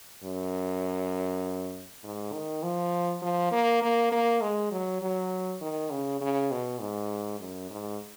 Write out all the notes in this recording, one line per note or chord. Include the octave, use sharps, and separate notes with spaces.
F#2
G#2
D#3
F3
F3
A#3
A#3
A#3
G#3
F#3
F#3
D#3
C#3
C#3
B2
G#2
F#2
G#2